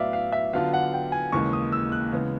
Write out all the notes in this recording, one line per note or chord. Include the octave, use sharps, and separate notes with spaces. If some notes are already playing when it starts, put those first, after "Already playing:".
Already playing: A2 F#3 B3 D5 E5 F5
F5
E5
D3 F#3 B3 D4 F4 F5
F#5
G5
G#5
D#2 C#3 E3 G#3 C#6
D#6
E6
F#6
C#3 E3 G#3 B3